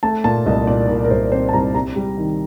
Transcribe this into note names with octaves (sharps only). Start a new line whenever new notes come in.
A3 A5
A#2 A5
C2 D#5
A#2 D5
A#2 A#4
A#4
C2 C5
C4 C5
A5
C2 A#5
C3 A#5
G3
D#3